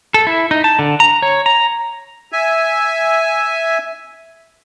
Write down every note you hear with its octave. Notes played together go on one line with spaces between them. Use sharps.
A4
E4
D#4
A5
D3
A#5
C#5
A#5
E5 G#5